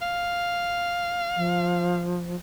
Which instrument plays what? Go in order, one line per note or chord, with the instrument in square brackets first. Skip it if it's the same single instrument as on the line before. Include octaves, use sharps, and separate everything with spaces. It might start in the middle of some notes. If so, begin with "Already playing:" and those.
[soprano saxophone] F5
[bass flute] F3